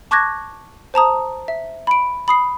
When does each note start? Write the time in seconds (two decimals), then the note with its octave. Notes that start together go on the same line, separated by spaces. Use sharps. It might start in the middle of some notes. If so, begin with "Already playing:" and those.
0.11 A5 C#6 D6 F#6 G#6 A#6
0.94 C5 A5 A#5 D#6
1.48 E5
1.87 B5 D7
2.28 B5 D#6 C7